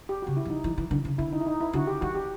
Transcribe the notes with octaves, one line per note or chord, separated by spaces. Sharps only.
G4
C#3 F#4
E4
F3
D#4
E3
E3
D3
C#3
D3 E4
D#4
E4
D#4
E4
D3 F#4
G4
D#3 F#4
G4